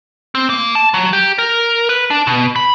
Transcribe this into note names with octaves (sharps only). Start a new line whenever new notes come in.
C4
A#3
A5
F#3
G4
A#4
B4
D4
B2
B5